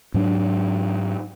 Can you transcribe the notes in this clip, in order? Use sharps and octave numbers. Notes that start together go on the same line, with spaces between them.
G#2 F#3 D4